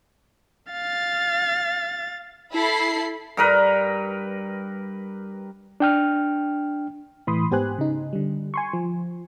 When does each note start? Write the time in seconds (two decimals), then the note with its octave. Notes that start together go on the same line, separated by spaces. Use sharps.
0.72 F5 A6
2.52 E4 A4 B5 C7
3.37 G2 A#4 B4
5.80 D4 G5 F6
7.27 A2 E3 B5 C6 D#6
7.51 G#2 B3 G4 C5 G#5 F#6
7.78 C#3 D#4
8.13 D3 G3
8.54 G#5 C6 C#6
8.73 F3